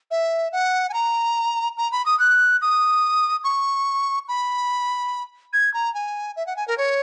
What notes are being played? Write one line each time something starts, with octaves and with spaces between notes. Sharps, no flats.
E5
F#5
G#5
A#5
A#5
B5
D#6
F#6
D#6
C#6
B5
G#6
A#5
G#5
E5
F#5
G#5
A#4
C#5